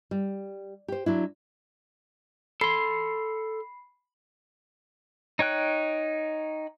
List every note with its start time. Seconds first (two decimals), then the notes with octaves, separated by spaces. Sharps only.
0.11 G3
0.88 G4 C5
1.06 F#3 D4 E4
2.61 A4 B5 C6 C7
5.39 D#4 C#5 G5 F#6